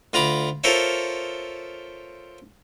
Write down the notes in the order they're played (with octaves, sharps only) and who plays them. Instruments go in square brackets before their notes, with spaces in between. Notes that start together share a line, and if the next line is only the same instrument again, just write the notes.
[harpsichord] D2 F4 A#5 B5 D6
F4 A4 A#4 C5 C#5 E5